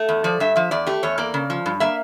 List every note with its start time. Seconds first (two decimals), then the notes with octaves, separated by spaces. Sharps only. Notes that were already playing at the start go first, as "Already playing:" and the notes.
Already playing: A3
0.09 E2
0.24 F3 D5
0.40 G2 E5
0.56 F3 E5
0.71 E2 D5
0.87 A3 G4
1.03 E2 C#5
1.18 A#3 D5
1.34 C#3
1.50 F3
1.66 G2
1.80 A#3 E5